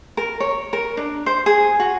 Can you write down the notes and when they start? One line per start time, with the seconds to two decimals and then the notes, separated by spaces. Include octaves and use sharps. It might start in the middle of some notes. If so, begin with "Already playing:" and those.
0.17 A#4
0.40 C#5
0.73 A#4
0.97 D4
1.26 C5
1.46 G#4
1.80 F#4